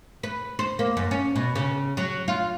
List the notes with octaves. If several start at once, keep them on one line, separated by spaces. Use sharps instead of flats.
B4
C5
A#3
F#2
C#4
B2
C#3
F#3
F4